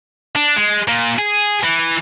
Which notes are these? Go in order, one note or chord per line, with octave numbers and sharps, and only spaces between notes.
D4
G#3
A#2
G#4
E3